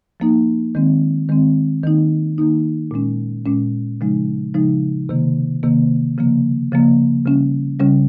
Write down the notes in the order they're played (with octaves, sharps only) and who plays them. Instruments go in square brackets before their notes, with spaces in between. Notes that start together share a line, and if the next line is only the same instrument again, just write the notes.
[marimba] F3 A#3 D#4
D#3 G#3 C4
D#3 G#3 C4
D#3 A#3 D#4
D#3 A#3 D#4
A#2 G#3 C#4
A#2 G#3 C#4
C#3 F3 G#3 D#4
C#3 F3 G#3 D#4
C3 D#3 A#3
C3 D#3 A#3
C#3 F3 A#3
C#3 F3 A#3
C#3 G3 C#4
C#3 G3 C#4